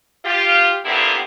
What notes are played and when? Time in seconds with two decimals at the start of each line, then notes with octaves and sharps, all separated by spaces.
0.25 F4 G4
0.85 A#2 D3 B3 C4 E4 G4